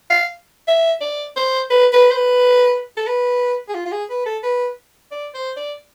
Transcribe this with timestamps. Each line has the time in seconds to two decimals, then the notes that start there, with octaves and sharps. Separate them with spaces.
0.10 F5
0.68 E5
1.01 D5
1.36 C5
1.70 B4
1.93 B4
2.11 C5
2.16 B4
2.97 A4
3.07 B4
3.68 G#4
3.75 F4
3.86 F4
3.92 G#4
4.09 B4
4.26 A4
4.43 B4
5.11 D5
5.34 C5
5.56 D5